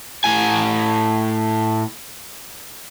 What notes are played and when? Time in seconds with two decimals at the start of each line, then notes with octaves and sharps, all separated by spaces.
0.24 A2 G#5